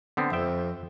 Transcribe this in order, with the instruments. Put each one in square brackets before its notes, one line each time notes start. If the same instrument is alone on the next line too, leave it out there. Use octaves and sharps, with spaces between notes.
[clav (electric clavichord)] D3 B3 C4
[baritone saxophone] F2 [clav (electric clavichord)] E5 G5